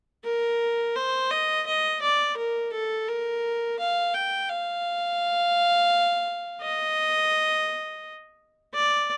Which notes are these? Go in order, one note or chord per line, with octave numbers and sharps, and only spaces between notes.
A#4
C5
D#5
D#5
D5
A#4
A4
A#4
F5
G5
F5
D#5
D5